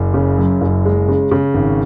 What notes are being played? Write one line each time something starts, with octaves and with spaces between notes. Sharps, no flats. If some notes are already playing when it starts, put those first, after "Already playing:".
Already playing: F#1
C#3
F#2
F#1
G#3
C#3
C#3
G#1